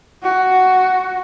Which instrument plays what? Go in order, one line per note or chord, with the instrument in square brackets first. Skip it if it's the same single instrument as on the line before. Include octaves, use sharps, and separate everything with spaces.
[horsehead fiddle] F#4